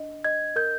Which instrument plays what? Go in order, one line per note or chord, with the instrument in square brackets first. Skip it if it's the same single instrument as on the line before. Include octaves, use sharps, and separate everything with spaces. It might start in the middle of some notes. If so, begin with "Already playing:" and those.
Already playing: [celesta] D4 D#5
[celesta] D#5 [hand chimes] G#6
[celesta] A#4 [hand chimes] G6